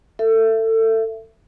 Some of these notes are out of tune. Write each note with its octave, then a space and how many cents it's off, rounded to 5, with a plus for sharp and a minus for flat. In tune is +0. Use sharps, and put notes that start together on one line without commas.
A4 +25 E5 +20